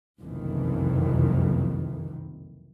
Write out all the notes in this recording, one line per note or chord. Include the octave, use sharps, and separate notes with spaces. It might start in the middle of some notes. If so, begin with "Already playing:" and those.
F#1 C2 F2 C3 D#3 E3